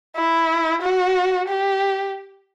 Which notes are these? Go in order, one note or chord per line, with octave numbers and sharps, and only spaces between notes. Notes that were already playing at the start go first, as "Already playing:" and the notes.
E4
F#4
G4